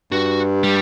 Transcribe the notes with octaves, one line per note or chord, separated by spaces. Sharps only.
G2 F#4
G3